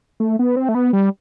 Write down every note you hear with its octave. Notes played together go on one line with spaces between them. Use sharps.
A3
B3
C4
A3
B3
G3